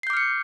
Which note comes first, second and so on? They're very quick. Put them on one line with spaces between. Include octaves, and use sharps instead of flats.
C7 G6 D6 F6 C#7